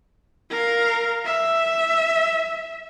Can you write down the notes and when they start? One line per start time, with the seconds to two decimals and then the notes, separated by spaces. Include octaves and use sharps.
0.51 A#4 F5
1.25 E5